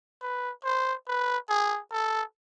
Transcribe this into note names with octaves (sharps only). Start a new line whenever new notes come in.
B4
C5
B4
G#4
A4